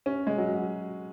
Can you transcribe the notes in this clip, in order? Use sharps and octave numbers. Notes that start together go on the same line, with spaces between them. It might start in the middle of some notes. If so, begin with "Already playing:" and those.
C#4
G#3
F#3
F#3